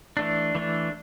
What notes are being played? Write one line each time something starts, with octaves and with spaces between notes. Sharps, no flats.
E3 A3 D4
E3 A3 D4